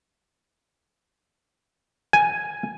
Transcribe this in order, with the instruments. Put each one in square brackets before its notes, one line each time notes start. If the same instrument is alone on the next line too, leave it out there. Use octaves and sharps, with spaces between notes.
[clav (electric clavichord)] G#5